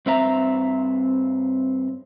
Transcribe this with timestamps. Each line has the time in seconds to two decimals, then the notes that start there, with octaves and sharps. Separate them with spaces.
0.06 G2 C4 E5 A#5